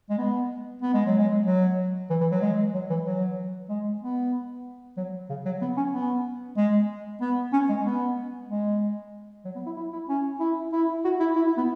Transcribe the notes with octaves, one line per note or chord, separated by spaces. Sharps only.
G#3
B3
B3
G#3
F#3
G#3
F#3
E3
E3
F#3
G#3
F#3
E3
F#3
G#3
B3
F#3
C#3
F#3
B3
C#4
B3
G#3
B3
C#4
G#3
B3
G#3
F#3
B3
E4
E4
E4
C#4
E4
E4
F#4
E4
E4
E4
B3